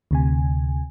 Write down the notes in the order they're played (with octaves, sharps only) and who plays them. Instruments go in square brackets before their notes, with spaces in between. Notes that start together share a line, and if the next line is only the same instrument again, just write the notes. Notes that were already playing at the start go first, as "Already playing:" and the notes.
[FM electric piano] D2 C3 G#5